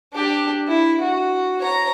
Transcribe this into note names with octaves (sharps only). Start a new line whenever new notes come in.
D4 G4
E4
F#4
C#5 A#5